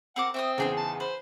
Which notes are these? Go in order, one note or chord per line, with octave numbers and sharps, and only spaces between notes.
C4 A#4 F#5 D6
C4 E5 C#6 D#6
E2 C#3 D#4 G#4 C5
A5
B4 C5